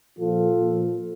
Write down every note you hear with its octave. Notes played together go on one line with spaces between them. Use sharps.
A#2 F3 F4 A4
A#2 F3